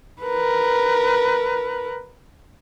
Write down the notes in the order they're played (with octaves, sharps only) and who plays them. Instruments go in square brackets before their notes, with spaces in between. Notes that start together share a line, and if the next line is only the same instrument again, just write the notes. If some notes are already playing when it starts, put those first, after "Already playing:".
[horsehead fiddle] A#4 B4